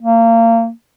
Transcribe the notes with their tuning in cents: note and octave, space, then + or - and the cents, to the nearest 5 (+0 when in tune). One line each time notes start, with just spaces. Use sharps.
A#3 -30